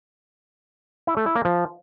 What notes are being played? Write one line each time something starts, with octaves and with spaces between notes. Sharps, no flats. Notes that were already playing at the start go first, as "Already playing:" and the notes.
E4
A3
E4
A#3
F3